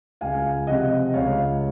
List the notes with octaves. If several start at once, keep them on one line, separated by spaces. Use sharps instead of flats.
C#2 F5 G#5
C3 F3 D#5 F#5
C#2 C#5 F5